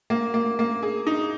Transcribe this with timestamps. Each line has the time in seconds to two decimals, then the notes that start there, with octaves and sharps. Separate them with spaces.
0.10 A#3
0.34 A#3
0.59 A#3
0.83 G#4
1.07 D#4